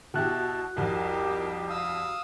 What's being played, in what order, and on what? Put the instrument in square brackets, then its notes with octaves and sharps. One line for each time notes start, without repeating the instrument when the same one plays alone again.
[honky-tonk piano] B2 E4 G4 [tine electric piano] F#4 F#6 [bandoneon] A5
[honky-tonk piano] C2 F2 [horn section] D#4 E4 G4 [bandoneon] A#4
[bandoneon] F5 D#6 E6